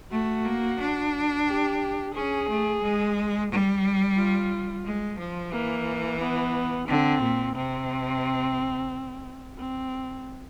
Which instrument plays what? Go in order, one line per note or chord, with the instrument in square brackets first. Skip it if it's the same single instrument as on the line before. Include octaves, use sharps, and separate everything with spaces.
[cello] A3 [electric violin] F#4
[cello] A#3
D4
[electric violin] G4
[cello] C#4 [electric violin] G#4
[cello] A3
G#3
G3
[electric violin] F4
[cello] G#3
F3
[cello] E3 [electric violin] A#3
[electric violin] B3
[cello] D3 [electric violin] C4
[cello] A#2
[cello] C3 [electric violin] C4
[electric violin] C4